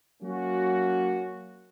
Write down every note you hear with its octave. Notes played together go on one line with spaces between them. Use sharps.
F#3 A#3 C#4 F#4